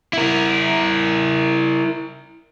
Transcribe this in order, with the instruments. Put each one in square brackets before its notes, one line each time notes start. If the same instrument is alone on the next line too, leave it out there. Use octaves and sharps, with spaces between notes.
[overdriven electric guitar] E4 A#4